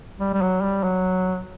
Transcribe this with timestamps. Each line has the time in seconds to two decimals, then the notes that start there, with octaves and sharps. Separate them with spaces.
0.20 G3
0.34 G3
0.42 F#3
0.62 G3
0.84 F#3